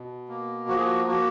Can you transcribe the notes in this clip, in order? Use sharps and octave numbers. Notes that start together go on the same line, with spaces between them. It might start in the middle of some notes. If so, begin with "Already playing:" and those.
Already playing: B2
A#3
F3 F#4
G#4
F#4
A#3 F#4